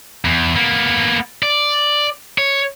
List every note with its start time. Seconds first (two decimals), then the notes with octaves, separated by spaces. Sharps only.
0.25 E2
0.56 A#3 B3
1.43 D5
2.38 C#5